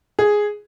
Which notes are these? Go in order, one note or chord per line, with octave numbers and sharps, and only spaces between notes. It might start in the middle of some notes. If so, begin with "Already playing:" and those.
G#4